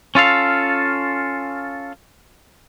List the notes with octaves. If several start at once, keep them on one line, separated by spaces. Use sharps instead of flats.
C#4 F4 A4 F5